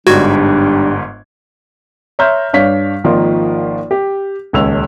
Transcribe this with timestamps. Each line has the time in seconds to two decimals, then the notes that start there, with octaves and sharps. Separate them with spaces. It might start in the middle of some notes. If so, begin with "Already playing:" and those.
0.07 G1 G#2 G3 D4 F#4 G#6
2.19 C#5 E5 A#5 C6 F6 G6
2.53 G2 D4 C#5 F5 B6
3.04 G#1 D#3 F3 A#3 F4
3.91 G4
4.53 D#1 C#2 C#4 E6 F7